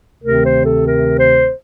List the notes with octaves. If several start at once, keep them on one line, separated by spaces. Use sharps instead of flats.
D2 C3 D#3 A3 C4 A#4
C5
A4
A#4
C5